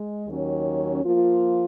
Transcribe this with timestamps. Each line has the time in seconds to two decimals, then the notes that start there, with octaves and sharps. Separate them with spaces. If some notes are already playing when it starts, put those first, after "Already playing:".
Already playing: G#3
0.27 D#2 D#3 F#3 C#4
1.04 F3 A#3 F4